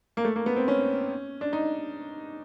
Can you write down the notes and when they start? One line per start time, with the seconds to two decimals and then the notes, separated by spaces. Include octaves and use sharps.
0.17 A#3
0.25 A3
0.36 A#3
0.46 B3
0.56 C4
0.68 C#4
1.41 D4
1.53 D#4